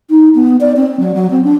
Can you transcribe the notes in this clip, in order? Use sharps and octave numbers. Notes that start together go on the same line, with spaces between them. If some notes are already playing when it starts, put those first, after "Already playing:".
D#4
B3
D5
C4
F#3
F#3
C4
D4